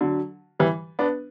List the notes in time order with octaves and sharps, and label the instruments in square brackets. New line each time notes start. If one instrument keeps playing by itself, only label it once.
[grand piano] D3 F#3
E3 G3
B3 D4